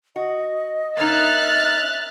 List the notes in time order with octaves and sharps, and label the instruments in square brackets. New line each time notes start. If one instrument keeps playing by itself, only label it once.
[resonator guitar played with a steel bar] F#4 [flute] D#5
[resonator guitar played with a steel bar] A#3 C#4 D#4 [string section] E5 F#6 [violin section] F6 A6